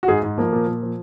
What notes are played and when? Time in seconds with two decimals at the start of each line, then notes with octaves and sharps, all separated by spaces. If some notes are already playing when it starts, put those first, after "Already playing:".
0.03 F#4
0.08 G#2 G#4
0.23 G#2
0.38 F3 A#3
0.53 A#2
0.67 A#2
0.82 F3